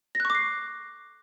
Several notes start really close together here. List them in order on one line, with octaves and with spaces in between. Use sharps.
A#6 F#6 C#6 D6 C7